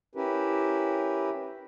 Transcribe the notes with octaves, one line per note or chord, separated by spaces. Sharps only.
C#4 E4 G4 A#4 B4